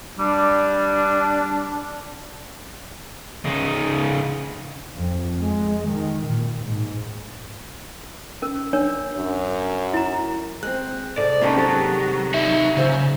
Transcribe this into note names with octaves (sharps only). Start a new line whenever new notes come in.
G3 D4
C#3 D#4
F2
G#3
D#3
A#2
G#2
C#4 A#4
D4 A#4 C#5
F#2
E4 A#5
G#3 C4 F#6
C2 F2 G#2 A4 D5
C3 D#3 G#3 A#3 C#4 C5 A5
F#3 G4 A4 A6
D#4 E5
A#2 C#3 C5 E5